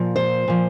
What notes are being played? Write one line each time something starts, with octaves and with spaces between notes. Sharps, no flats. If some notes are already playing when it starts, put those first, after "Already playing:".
Already playing: A#2 F3
C5
A#2 F3